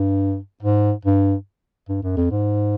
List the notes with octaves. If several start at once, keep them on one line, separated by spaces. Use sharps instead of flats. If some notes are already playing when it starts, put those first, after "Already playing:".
Already playing: G2
G#2
G2
G2
F#2
F2
G#2